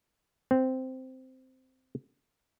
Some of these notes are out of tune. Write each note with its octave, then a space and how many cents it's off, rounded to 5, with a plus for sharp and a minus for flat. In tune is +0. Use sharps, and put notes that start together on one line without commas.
C4 -10